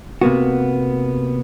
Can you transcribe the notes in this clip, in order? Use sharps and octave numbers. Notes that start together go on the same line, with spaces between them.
C3 A#3 B3 F#4